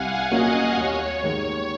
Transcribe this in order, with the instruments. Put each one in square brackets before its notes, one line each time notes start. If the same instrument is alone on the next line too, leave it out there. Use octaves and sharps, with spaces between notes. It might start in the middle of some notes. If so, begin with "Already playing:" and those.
Already playing: [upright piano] C2 [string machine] F5 F#5 G#5
[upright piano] A#2 F#3 A#3 C#4 [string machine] D#5
[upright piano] D#2 [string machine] C#5
[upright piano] D#3 G#3